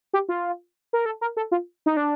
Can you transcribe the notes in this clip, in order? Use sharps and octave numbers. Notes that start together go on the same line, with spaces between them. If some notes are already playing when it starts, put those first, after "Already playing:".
G4
F4
A#4
A4
A#4
A4
F4
D#4
D4